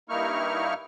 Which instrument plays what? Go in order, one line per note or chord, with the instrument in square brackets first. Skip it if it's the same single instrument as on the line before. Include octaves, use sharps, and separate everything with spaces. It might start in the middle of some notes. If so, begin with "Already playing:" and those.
[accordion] G2 A#3 D#4 E4 C#6 F6